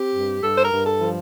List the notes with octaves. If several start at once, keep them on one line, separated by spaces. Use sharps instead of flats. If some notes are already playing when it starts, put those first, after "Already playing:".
Already playing: C4 G4
G2
G2 A4
C5
A#4
G2
A4
F3